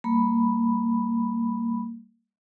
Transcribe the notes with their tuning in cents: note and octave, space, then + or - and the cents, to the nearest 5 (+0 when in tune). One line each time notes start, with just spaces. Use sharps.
G3 +0 A#3 -15 B5 +0